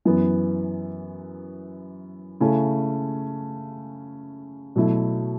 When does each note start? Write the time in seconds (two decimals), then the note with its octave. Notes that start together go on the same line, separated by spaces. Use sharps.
0.05 F#2 E3 B3
2.40 C#3 A3 C#4 E4
4.76 B2 F#3 A3 E4